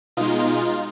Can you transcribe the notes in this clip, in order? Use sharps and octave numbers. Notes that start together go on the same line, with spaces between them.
B2 G#3 D#4 F4